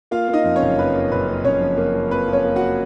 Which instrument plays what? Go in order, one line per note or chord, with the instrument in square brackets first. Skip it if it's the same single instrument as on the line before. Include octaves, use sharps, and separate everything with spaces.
[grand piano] A#3 F4 F5
A#3
D#4 D#5
F2
C#4 C#5
F#1
F3 B4
A#3
F#1 B4
A#3
F#1 C#4 C#5
F3
A#3
F3
F2 B4
F3
C#4 C#5
A#3
F#4 F#5